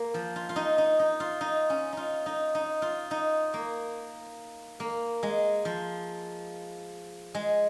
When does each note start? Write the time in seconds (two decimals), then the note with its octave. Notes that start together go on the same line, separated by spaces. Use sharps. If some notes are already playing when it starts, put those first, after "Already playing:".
Already playing: A#3
0.14 F3
0.36 F4
0.49 F4
0.56 D#4
0.78 D#4
0.99 D#4
1.20 F4
1.41 D#4
1.70 C#4
1.93 D#4 F4
2.26 D#4
2.55 D#4
2.82 F4
3.11 D#4
3.54 A#3
4.80 A#3
5.23 G#3
5.65 F3
7.35 G#3